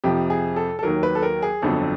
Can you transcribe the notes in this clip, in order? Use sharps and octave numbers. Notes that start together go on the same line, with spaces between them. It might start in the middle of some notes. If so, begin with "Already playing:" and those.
F2 C3 F3 G4
G#4
A4
A4
D#2 D#3 F#3 A#4
B4
A4
A#4
G#4
G1 F2 D3 F#3 A4